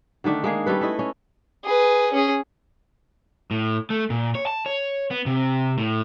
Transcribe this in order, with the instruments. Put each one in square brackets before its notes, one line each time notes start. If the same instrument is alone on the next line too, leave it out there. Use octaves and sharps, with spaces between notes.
[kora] D3 D#3 A3 D4
G#3 A#3 G#4
G3 C#4 A4 B4
A3 E4 D#5
C#4
[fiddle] G#4 B4
C#4 G#4
[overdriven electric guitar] A2
A3
A#2
C#5
A5
C#5
B3
C3
A2